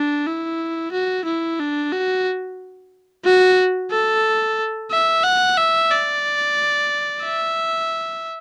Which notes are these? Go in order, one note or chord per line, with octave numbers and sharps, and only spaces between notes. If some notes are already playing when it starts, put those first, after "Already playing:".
Already playing: D4
E4
F#4
E4
D4
F#4
F#4
A4
E5
F#5
E5
D5
E5